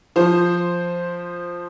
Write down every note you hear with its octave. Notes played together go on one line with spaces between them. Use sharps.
F3 C5